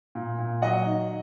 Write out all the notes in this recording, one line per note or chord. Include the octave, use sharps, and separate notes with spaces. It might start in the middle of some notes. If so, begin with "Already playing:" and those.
A#2
A#2
F#3 D#5 F#5
D#3